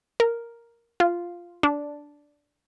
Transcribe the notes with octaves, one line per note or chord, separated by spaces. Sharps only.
A#4
F4
D4